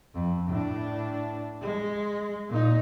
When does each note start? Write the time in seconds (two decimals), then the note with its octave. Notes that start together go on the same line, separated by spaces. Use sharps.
0.14 F2
0.48 A2 D4
1.61 G#3
2.49 A#2 D#4